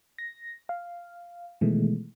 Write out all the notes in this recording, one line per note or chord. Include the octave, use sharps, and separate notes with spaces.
A#6
F5
B2 D#3 E3 G#3 A3